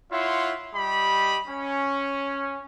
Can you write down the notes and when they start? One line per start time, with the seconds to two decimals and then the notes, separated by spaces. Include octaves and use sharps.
0.12 E4 F4 C#5 E5 F#5 C6
0.75 G3 G4 D#5 B5
1.47 C#4